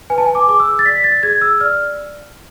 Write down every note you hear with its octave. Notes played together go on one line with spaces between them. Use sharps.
B4 G#5
A5
G#5
D6
G#4 D6
E6
A6
D5 B6
A6
G#4 G#6
E6
D5 F6